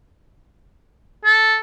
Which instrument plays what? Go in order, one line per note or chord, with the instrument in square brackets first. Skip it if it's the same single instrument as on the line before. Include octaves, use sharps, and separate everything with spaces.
[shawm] A4